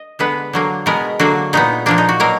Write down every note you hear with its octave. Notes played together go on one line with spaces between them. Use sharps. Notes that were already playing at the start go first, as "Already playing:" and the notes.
Already playing: D#5
D3 G#3 B3 B4
D3 F#3 A#3
B2 G#3 B3 A#4
D3 F#3 A#3 F#4
A#2 G#3 B3 D#4
A#2 F3 A#3 D4
D#4
F#4
B2 F#3 A#3 A#4